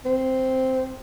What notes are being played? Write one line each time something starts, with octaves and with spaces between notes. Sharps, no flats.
C4